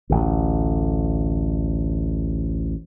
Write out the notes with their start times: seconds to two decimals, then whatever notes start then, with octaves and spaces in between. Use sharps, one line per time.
0.10 A1 D2